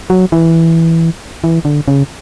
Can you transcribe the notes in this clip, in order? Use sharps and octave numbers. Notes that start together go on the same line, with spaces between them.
F#3
E3
E3
D3
C#3